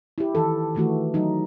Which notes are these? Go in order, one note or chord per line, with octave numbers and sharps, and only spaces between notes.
E4 G4
D#3 E3 A4
D#3 E3 A3 F#4
F#3 D#4